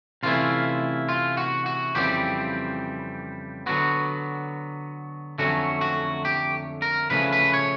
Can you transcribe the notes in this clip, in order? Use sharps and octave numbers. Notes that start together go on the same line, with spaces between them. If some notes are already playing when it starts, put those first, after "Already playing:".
C3 E3 A3 C#4 E4 F4
F4
F#4
F#4
F2 C#3 E3 G3 C4 G4
D3 F#3 B3 F#4
F2 D3 F#3 A3 C#4 F#4
F#4
G4
A#4
C#3 F3 A3 C#4 B4
B4
C#5